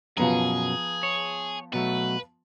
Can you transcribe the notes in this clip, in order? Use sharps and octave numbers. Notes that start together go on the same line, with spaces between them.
F#2 B2 F3 B3 G#4 A#5
C#5
B2 F#3 A3 B4